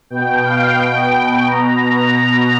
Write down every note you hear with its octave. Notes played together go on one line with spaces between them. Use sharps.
B2 G5
F5
B2 G5
B2 A#5
A#5
B2 A#5